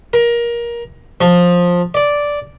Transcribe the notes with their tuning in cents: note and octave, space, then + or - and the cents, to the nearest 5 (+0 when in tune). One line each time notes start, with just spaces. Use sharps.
A#4 +20
F3 +15
D5 -5